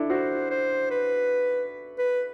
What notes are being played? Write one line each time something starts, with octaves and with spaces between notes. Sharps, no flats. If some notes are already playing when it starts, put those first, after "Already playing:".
Already playing: D4 E4 A4
F#4 C5
C5
B4
B4